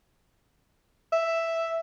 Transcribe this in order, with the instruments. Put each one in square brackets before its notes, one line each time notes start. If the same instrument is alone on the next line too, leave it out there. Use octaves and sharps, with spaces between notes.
[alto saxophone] E5